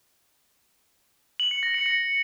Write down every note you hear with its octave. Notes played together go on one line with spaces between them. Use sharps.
F#7
C#7
A#6
C#7
C#7